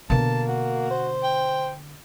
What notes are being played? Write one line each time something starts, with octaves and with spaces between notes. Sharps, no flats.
B2 D3 A#3 A5
F#4
C5
G5